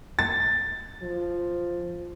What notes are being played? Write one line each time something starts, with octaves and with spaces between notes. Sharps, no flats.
A6
F3